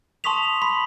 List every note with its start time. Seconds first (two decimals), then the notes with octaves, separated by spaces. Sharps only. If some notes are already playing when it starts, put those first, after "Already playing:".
0.24 A5 C6 C#6 D#6 B6 F7
0.62 B5 C6 B6